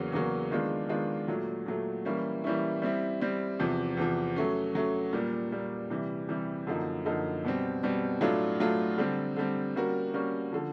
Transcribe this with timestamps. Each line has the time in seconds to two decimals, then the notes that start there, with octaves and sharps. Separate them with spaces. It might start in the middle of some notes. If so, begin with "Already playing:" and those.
Already playing: E2 C#3 F#3 A#3 C#4
0.12 E2 C#3 F#3 A#3 C#4
0.51 D#3 G#3 B3 D4 F4
0.89 D#3 G#3 B3 D4 F4
1.28 A#2 F#3 A3
1.66 A#2 F#3 A3
2.05 E3 G3 A#3 C#4 E4
2.44 E3 G3 A#3 C#4 E4
2.82 G3 C4 E4
3.20 G3 C4 E4
3.59 E2 C3 F3
3.97 E2 C3 F3
4.36 F#3 A3 C#4
4.75 F#3 A3 C#4
5.13 A#2 G3 A#3
5.52 A#2 G3 A#3
5.90 C3 E3 G3
6.29 C3 E3 G3
6.67 F#2 D3 F3 A#3 D#4
7.05 F#2 D3 F3 A#3 D#4
7.44 B2 G3 C4
7.83 B2 G3 C4
8.21 A2 F#3 A3 D4 F4
8.60 A2 F#3 A3 D4 F4
8.98 D3 G3 C4
9.36 D3 G3 C4
9.76 G3 A#3 C#4 F#4 A#4
10.14 G3 A#3 C#4 F#4 A#4
10.53 D3 F3